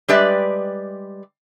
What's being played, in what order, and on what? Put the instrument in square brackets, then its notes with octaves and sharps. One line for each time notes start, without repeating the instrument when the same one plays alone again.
[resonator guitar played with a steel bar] G3 G#3 G4 B4 D5 E5